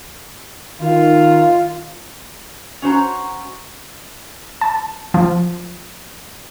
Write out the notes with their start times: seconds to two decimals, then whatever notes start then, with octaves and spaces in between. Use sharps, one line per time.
0.81 D#3 F4
2.82 C#4 F#4 C5 A#5
4.61 A5
5.14 F3